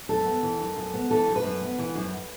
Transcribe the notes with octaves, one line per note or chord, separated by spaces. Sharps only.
F#2 A4
B3
E3
F#2
F#2
B3
E3 A4
F#2
B4
F#2
B3
E3
F#2